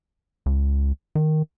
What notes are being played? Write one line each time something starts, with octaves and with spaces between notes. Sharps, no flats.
C#2
D#3